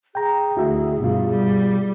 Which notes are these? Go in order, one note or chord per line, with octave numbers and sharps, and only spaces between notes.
G#4 G5 A#5
D2 E4 F#4 E5
G2 B2 F4
G3